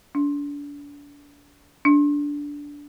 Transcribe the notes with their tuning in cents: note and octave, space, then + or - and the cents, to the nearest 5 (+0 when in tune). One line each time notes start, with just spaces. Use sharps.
D4 -35
D4 -15